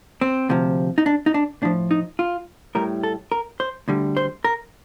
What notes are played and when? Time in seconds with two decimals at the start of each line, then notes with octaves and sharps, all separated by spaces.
0.21 C4
0.49 D2 C3 F3
0.98 D#4
1.06 D4
1.26 D#4
1.34 D4
1.62 A2 F3 D4
1.91 D#4
2.19 F4
2.75 A2 G3 A#4
3.03 A4
3.32 A#4
3.60 C5
3.88 D2 D3 G3
4.17 C5
4.44 A#4